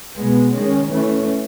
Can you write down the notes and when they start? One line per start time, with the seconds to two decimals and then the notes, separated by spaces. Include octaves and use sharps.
0.19 B2 G#3 B3
0.55 D#3 G#3 C#4
0.91 E3 A3 C#4